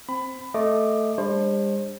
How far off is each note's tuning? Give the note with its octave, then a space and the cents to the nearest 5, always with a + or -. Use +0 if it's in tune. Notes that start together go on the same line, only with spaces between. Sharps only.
C4 +0 B5 +20
A3 +0 D#5 +0 D6 +15
G3 +45 D4 +0 C5 +35